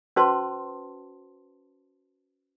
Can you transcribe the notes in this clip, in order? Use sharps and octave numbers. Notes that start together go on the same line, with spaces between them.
C#4 F#4 B4 C5 A5 C6